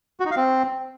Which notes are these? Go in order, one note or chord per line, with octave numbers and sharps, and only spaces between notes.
F#4
D#4
F5
C4